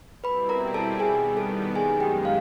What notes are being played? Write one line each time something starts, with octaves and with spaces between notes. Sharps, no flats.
B2 G3 C4 E4 B4 B5
A#4 A#5
A4 A5
D#3 G3 B3 G#4 G#5
A4 A5
F#2 D#3 G#3 G#4 G#5
G4 G5
F5